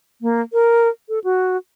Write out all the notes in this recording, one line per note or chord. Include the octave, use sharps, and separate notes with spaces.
A#3
A#4
A4
F#4